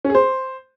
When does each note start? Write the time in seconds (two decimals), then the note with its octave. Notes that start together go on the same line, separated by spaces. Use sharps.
0.05 C#4
0.10 G#4
0.15 C5